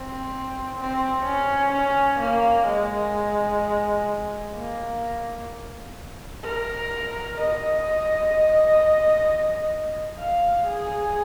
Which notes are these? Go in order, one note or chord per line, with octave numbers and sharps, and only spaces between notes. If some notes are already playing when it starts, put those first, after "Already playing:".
Already playing: C4
C4
C#4
C#4
A#3
G#3
A#3
A#4
D#5
F5
G#4